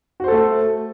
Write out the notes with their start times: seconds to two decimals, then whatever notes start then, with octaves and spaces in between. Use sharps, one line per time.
0.20 F#4
0.24 C5
0.28 A4
0.32 A3